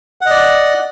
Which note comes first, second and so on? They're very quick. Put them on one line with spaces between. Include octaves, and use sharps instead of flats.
F#5 D#5 D5